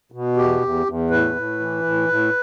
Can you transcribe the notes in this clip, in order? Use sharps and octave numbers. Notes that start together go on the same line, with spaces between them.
B2
E2 G4
E2
E2
A2 B4
A2
E3
A2
A2